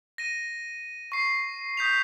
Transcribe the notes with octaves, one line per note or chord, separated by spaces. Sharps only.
A#6 D#7
C#6 C7
D#6 G6 B6 F7